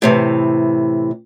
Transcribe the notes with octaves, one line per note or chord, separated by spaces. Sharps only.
A2 C3 E3